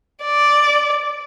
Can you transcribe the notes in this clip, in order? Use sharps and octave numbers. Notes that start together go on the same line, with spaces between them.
D5